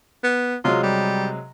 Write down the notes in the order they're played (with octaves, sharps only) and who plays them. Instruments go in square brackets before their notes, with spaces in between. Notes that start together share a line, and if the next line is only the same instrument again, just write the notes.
[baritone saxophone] B3
[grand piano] C3 F#3 G#3 [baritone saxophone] F4
[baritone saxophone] G3